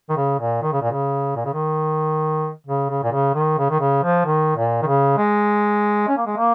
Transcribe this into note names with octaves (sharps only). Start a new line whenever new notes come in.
D#3
C#3
A#2
D#3
C#3
A#2
C#3
A#2
C#3
D#3
C#3
C#3
A#2
C#3
D#3
C#3
D#3
C#3
F3
D#3
A#2
D#3
C#3
G#3
C#4
A#3
G#3
A#3